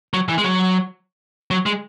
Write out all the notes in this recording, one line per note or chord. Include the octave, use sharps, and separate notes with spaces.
F#3
E3
G#3
F#3
F#3
G#3